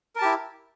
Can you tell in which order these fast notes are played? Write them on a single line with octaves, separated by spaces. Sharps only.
A#4 A5 G4 E4